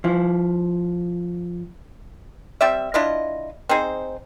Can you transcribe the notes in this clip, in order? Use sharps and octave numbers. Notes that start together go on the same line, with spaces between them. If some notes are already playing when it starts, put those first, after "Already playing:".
F3 E4
G3 C4 D5 E5
D4 E4 F4 D#5
C4 D#4 G#4 C5